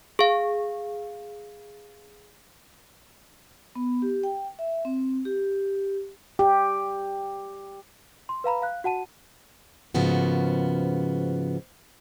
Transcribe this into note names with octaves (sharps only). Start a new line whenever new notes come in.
G#4 F5
B3
G4
G5
E5
C4
G4
G4
C6
B4 F5 A#5 B5
F5 F#6
F#4 F#5 A5 D#7
G#2 C#3 F3 A#3 B3 F#4